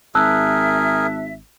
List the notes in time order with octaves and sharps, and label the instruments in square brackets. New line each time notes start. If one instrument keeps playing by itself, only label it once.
[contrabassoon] G#1 [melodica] G#4 A#4 [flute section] E5 [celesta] A5 E6 F#6